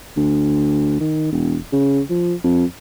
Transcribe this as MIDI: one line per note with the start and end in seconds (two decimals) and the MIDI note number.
0.17 0.98 38
1.00 1.29 51
1.32 1.58 28
1.72 2.01 49
2.10 2.34 53
2.44 2.65 41